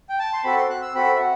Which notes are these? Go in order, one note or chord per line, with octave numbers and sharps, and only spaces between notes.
G5
A5
C6
C4 F#4 A4 B5
C6
F#6
E6
C4 F#4 A4 B5
E5
F#5